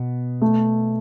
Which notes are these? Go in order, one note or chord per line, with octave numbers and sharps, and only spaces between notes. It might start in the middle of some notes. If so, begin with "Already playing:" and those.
Already playing: B2 B3
A3